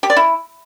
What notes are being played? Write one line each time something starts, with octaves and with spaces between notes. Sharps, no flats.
G4
D5
E4